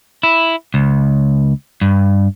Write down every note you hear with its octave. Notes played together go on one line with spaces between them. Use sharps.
E4
C#2
G2